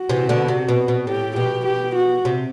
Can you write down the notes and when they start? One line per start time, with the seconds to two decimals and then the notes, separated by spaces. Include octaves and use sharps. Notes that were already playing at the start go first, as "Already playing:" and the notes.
Already playing: F#4
0.10 C3 E3
0.29 B2 D3
0.48 C3
0.68 B2
0.88 B2
1.07 A2 G4
1.36 B2 G4
1.65 G4
1.95 F#4
2.25 C3